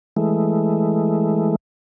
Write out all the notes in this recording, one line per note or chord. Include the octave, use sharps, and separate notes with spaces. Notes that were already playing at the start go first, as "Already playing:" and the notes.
E3 G#3 A3